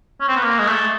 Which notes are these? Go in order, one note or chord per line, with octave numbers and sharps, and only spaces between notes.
C#4
C4
B3
A#3
G#3
A3